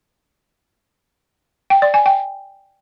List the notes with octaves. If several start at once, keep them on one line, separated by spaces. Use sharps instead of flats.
G5
D5
G#5
G5